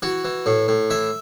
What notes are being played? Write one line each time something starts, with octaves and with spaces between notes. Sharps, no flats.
E3 F#4
E3
A2
A2
E3 E5